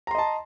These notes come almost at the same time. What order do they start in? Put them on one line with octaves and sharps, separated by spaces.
A#5 C6 D#5 A5